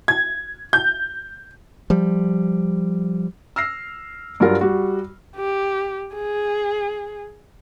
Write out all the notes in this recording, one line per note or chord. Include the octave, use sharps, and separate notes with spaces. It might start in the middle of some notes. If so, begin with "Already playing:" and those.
G#6
G6
F3 G3
E6 F6 A#6 C7
G2 F#3 F4 A#4 F5
G3 F#4
G4
G#4